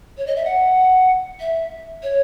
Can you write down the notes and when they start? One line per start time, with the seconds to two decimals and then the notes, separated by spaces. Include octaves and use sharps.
0.18 C#5
0.27 D#5
0.36 E5
0.45 F#5
1.40 E5
2.03 C#5